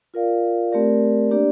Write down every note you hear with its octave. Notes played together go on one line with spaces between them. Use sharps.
F4 A#4 D5 F5
A3 C4 G4 A#4 D5
A#3 D4 G4 D5